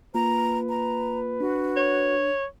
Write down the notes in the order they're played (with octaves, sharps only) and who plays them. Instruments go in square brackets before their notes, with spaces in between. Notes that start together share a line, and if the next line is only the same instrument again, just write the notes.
[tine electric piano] A#3 F4 [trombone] B4 [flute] A#5
[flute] A#5
[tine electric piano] D4 [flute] F#4
[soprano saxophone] C#5